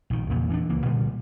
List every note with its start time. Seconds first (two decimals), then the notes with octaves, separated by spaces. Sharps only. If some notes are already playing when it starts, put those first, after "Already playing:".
0.10 A#1 D#3
0.30 E2 G2 A#2 C#3
0.50 E3 C#4 D4
0.69 C#2 E3 A#3
0.85 A#2 D3 G3 G#3